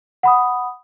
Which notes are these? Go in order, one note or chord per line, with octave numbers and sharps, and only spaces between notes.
F#5 B5 D#6